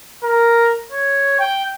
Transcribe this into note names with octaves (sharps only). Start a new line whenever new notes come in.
A#4
C#5
G5